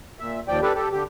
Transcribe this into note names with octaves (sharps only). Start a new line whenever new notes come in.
A#2 E5
D#2 F3 D5 G5
D4 G4 A4 B4
G4 A4
D3 G4